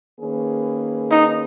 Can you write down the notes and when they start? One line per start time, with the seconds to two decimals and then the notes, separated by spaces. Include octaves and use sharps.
0.18 D#3 A#3 C#4 G#4 B4
1.11 D#4